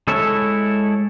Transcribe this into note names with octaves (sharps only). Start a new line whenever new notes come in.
G#3 E4 A4 C#5 E5